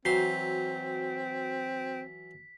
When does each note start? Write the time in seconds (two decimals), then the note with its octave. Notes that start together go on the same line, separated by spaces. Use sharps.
0.05 E3 F#3 C4 F#4 C6 B6